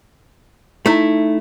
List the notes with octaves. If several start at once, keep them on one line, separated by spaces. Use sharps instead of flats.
A3 D#4 E4